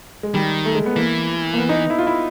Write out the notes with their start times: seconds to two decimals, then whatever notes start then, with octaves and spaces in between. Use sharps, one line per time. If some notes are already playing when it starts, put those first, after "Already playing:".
0.23 G#3
0.34 D#3 G3
0.65 A3
0.75 G#3
0.86 B3
0.96 E3 A#3
1.54 A#3
1.58 B3
1.69 D#4
1.90 E4
1.99 F4
2.07 E4